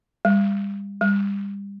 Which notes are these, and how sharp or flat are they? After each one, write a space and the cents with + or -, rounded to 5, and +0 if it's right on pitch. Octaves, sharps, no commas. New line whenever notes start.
G3 +35
G3 +30